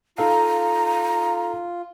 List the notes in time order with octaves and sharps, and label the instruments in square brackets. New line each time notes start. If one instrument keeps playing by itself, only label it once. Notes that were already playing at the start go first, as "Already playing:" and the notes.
[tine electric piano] D#4 A4 F5 [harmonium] F4 [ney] A#5